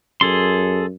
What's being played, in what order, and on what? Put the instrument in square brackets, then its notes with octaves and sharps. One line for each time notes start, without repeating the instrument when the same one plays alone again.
[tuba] F#2 [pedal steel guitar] G#4 A4 C6